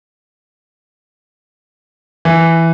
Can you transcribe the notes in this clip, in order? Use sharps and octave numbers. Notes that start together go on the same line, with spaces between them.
E3